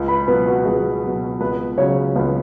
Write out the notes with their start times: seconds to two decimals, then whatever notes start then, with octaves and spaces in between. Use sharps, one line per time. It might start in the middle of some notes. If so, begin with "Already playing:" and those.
Already playing: C#2
0.08 B4 B5
0.28 B2 F#3 B3 B4
0.47 F#4
0.65 C#2 G#4
1.03 B2 F#3
1.41 C#2 B3 B4
1.78 C#3 F#3 C#4 C#5
2.16 C#2 B3 B4